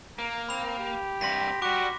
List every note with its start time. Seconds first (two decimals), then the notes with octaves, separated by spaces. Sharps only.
0.18 A#3 A#5
0.49 C4 B5 F7
0.79 G4
1.21 G2 C3 C6 A#6 B6
1.62 G3 F#4 G4 D6